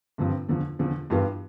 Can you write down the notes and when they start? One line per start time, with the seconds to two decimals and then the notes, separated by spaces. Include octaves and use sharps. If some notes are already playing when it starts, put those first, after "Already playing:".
0.18 G2 D3 F3 C4
0.49 E2 D3 F3
0.79 E2 D3 F3
1.10 G2 E3 B3 F4